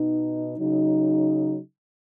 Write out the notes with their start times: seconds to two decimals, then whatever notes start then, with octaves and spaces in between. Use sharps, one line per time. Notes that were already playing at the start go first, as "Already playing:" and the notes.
Already playing: B2 B3 D#4
0.58 C#3 F#3 D#4